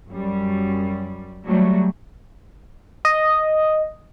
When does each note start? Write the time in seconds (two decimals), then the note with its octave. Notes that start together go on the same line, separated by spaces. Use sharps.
0.10 F#2 G3
1.46 F#3 G3 A3
3.05 D#5